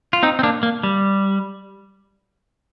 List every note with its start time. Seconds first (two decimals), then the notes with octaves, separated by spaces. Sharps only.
0.13 F4
0.23 C4 D#4
0.39 C4
0.43 A#3 D4
0.63 A#3
0.83 G3